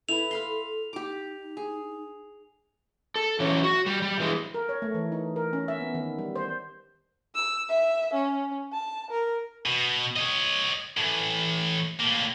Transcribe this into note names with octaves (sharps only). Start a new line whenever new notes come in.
E4 A4 B4 F7
F5 B5 C6
D#4 G4 D6
G#4
A4
E3 F#3 C#4
F#4
G3
G3
E3 G#3
A#4
C#5
A3
E3
D#4
A#4
C#4
E5
B3
D#3
G3
C5
E6
E5
C#4
A5
A#4
B2
C#5 D#5
A2 E3
A2 A#3